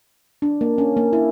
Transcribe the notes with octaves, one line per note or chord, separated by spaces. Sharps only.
D4
A#3
C#4
A#3
E4